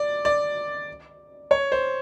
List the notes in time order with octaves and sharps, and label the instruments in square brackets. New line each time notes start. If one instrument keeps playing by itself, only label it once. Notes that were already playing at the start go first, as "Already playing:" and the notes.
Already playing: [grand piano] D5
D5
C#5
C5